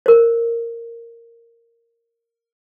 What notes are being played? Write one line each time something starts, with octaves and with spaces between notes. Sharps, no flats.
A#4 C5